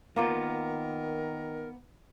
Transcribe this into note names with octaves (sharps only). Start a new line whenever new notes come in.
D#3 A#3 B3 F4 A#4 F5 A#5 D6